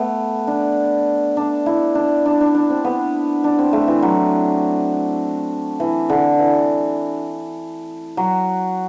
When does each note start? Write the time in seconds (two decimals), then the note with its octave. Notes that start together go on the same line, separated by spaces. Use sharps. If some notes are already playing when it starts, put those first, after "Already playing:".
Already playing: A3 B3
0.47 D4
1.37 D4
1.66 E4
1.95 D4
2.25 D4
2.41 D4
2.55 D4
2.70 C4
2.84 B3
3.44 D4
3.59 C4
3.73 A3
3.88 E3
4.02 F#3
5.80 E3
6.09 D3
6.39 E3
8.17 F#3